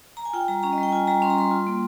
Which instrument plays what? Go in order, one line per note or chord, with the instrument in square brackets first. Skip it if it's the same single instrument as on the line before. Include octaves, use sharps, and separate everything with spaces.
[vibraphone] A#5
G#5
F4 G5
G3 A#5
C#4 A#5
D#5
G3
G5
F4 G#5
G3 A#5
C#4 C6
A#5
G3 C6
F4
A#3